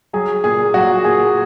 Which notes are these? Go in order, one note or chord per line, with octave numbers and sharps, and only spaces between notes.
F#3 G#4
A#2 G#4
F#3 F#4
A#2 G#4